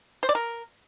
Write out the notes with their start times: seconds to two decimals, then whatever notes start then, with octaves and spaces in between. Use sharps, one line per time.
0.23 C5
0.29 D5
0.35 A#4